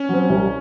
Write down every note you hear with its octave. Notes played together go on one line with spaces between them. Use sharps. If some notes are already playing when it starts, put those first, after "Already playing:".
Already playing: C#4
F#3 C4
C2